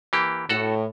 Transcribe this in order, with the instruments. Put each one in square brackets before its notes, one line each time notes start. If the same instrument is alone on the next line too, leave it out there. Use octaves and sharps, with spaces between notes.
[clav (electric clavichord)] E3 A#3 G4
[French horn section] A2 [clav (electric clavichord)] F#4 A4 F#5